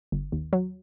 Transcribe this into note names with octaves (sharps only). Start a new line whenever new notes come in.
G1
D#2
F#3